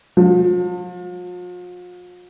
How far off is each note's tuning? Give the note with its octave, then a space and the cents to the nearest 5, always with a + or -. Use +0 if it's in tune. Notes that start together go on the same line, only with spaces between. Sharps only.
F3 +40